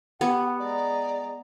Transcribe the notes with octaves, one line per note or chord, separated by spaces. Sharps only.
B3 G4 F#5
G#3 D5 A#5